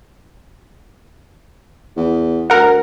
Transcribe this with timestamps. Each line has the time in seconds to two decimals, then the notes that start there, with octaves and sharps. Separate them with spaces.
1.97 E2
2.50 D2 A#4 F#5